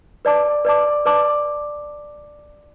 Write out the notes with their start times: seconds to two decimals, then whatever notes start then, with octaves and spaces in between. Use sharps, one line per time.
0.25 B4 D5 A5 D6
0.65 B4 D5 A5 D6
1.06 B4 D5 A5 D6